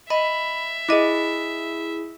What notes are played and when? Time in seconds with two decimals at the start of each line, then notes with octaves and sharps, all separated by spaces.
0.10 D#5 E5 B5
0.89 E4 G#4 D#5 D6